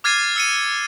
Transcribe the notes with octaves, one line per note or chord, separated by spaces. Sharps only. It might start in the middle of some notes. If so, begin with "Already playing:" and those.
D6 F6 G#6 A6 C7 D#7
E6 C#7 D#7